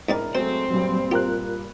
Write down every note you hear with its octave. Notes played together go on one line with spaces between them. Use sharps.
G#2 C4 D4 E4 A#4 D5
F#3 G#3 A3 C4 C5
G2 A#2 F#3 G3
F4 G4 A#4 F#6